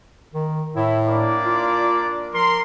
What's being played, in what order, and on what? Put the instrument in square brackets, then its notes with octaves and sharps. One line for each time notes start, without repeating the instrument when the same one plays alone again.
[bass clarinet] D#3
[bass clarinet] A2 [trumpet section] E4
[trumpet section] A#3 D4 D5
[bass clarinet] F4
[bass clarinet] F3 [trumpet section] A#4 C6